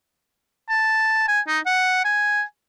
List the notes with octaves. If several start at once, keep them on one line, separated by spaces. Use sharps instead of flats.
A5
G#5
D#4
F#5
G#5